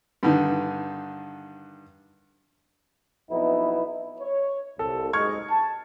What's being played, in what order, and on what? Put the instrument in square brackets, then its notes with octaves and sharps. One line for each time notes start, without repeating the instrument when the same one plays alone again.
[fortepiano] G2 D3 D#3
[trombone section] B1 F2 B3 D#4 E4
[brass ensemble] C#5
[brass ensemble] C2 [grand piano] A4
[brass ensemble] F#1 G#2 D#5 [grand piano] C#6 F6 G#6
[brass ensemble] A5